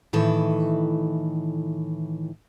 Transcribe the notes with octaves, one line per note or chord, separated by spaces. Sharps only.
A2 D#3 E3 A4